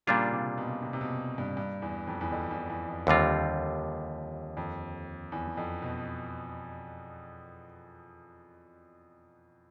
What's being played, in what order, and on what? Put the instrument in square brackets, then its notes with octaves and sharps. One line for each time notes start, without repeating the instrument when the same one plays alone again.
[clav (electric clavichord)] A#2 G3 A#3 D4 F4 [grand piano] C#3
[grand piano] C3
B2
C3
C3
B2
G2
G2
E2
F2
E2
F2
E2
E2
F2
[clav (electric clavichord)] D#2 D3 G3 C4 F4
[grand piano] F2
E2
F2
B2